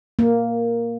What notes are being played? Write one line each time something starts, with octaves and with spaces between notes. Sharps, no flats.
A#3